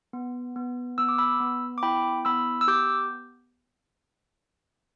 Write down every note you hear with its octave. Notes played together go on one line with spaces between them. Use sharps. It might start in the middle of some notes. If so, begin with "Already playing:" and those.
B3
B3
B3 E6
D6
B5 E6
B3
D6
E4 G5 B5
B3 B5 E6
E6
G4 D6 G6